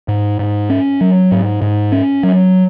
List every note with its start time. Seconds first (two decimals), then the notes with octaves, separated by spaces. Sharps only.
0.08 G#2
0.39 G#2
0.70 C#4
1.01 F#3
1.32 G#2
1.62 G#2
1.92 C#4
2.23 F#3